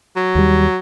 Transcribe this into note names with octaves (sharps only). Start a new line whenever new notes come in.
F#3
D#2 G3